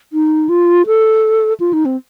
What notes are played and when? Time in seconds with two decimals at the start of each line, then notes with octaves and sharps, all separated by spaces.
0.13 D#4
0.49 F4
0.87 A4
1.60 F4
1.73 D#4
1.85 C4